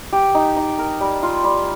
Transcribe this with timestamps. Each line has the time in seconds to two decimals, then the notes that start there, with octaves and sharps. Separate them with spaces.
0.13 G4
0.35 D#4
0.57 D#4
0.79 A#4
1.01 G3
1.23 F4
1.44 G3